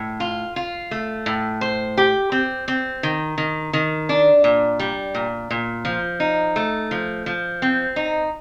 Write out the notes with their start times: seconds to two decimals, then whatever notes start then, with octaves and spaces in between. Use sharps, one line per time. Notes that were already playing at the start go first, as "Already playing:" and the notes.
Already playing: A2
0.20 F4
0.56 F4
0.91 A3
1.26 A2
1.61 C5
1.97 G4
2.32 C4
2.68 C4
3.03 D#3
3.38 D#3
3.73 D#3
4.09 D4
4.44 A#2
4.79 G3
5.15 A#2
5.50 A#2
5.85 F3
6.20 D#4
6.56 A3
6.91 F3
7.26 F3
7.62 C4
7.96 D#4